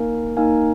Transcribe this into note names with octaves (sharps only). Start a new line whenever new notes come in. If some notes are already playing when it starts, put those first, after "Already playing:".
Already playing: A#3 D#4 A#4 F5 G#5
A#3 D#4 A#4 F5 G#5